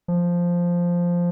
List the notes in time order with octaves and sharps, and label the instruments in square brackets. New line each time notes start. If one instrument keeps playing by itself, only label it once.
[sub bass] F3